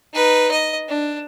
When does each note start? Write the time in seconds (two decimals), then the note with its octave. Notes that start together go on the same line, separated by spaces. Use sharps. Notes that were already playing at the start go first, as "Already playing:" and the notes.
0.14 D#4 B4
0.51 D#5
0.88 D4